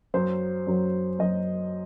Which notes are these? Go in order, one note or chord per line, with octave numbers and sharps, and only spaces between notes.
F#2 F#3 C5
F#2 F#3
F#2 F#3 D#5